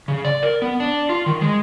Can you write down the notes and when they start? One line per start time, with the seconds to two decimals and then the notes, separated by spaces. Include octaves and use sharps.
0.08 C#3
0.25 D5
0.43 A#4
0.62 B3
0.80 D4
1.09 F4
1.26 D#3
1.41 G#3